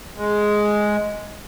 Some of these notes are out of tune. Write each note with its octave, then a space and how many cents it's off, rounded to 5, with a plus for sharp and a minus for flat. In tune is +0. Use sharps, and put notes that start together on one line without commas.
G#3 +5